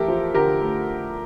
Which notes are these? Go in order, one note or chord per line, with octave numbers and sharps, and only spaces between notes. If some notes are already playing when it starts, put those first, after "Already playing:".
Already playing: E2 A3 G4 A4 A#4 E5
F3
D3 G4 A#4
A3